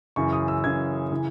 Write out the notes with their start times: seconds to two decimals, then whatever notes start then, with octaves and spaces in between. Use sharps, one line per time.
0.16 F#2 C#3 E3 C#6
0.33 D#6
0.48 E6
0.64 F#2 C#3 E3 G#6
1.12 C#3 E3